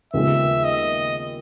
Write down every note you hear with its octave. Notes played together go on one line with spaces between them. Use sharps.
D#2 C#3 F3 G#3 B3 E5
D#5